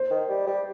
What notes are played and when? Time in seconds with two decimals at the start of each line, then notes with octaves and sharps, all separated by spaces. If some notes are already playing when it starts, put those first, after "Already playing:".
Already playing: C5
0.10 D#3
0.29 G3
0.47 G3